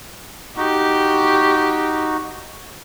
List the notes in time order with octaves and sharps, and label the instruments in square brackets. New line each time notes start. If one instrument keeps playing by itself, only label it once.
[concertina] D#4 F#4 [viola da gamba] G4